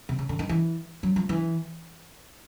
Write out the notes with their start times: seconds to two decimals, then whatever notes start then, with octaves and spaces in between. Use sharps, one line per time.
0.09 C3
0.19 C#3
0.29 D3
0.39 D#3
0.49 E3
1.03 F#3
1.16 F3
1.29 E3